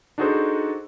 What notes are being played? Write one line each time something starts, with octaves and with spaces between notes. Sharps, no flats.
D4 D#4 F#4 G#4 A4 C5